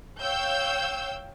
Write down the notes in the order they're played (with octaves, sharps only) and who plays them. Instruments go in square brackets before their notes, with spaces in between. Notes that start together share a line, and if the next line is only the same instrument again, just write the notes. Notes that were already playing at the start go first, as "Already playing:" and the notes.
[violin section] C#5 F5 G5 E6 G6